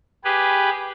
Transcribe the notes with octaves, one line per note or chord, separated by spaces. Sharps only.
G4 G#4 B4